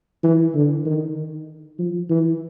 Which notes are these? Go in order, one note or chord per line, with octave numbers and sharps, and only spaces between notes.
E3
D3
D#3
F3
E3